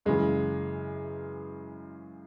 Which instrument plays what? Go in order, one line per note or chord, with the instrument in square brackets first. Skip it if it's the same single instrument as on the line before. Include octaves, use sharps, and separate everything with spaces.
[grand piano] F#2 C#3 E3 G#3